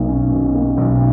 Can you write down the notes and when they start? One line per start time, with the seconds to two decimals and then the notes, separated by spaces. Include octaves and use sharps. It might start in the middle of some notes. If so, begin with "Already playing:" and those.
Already playing: B1 A#3
0.08 C#4
0.31 B2
0.55 A#3
0.77 B1